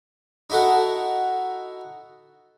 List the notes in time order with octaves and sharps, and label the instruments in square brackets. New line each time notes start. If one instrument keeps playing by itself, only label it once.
[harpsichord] D#4 E4 F#4 A4 F#5